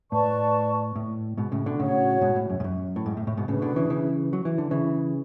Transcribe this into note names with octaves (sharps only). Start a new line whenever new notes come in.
A2 B4 D5 A5 C#6
A2
G#2 B2
A2 C#3
B2 D3
A2 C#3 F#4 C#5 F#5
G#2 B2
A2
F#2
G#2
F#2
A2
G#2
A2
A2
G#2 B2
A2 C#3 D4 G#4 B4
B2 D3
C#3 E3
C#3 E3
F#3
E3
D3
C#3 E3